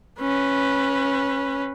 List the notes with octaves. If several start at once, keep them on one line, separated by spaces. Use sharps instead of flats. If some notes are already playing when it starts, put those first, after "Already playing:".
C#4 B4